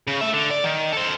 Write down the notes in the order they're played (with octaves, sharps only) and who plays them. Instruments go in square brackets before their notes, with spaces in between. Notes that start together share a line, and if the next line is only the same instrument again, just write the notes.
[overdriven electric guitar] C#3
A3 E5
D3
D5
D#3
A4 C5